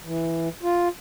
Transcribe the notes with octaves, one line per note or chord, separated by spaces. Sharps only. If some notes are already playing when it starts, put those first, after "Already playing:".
E3
F4